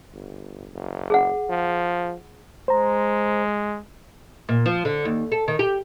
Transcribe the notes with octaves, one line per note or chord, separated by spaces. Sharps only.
G1
F#1
G#4 F#5
F3
G#3 C5 A#5
A#2
F3
D3
D#2
A4
D#3
G4